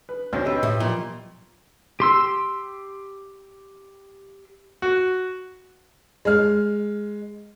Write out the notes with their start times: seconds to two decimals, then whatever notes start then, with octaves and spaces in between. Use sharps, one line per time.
0.09 B4
0.33 D2 A#2 D3 C#4 C5
0.45 C4 G4 B4 D#5 E6
0.63 A2
0.80 A#2 F3 F#3
2.00 G4 C6 E6
4.82 F#4
6.25 G#3 F6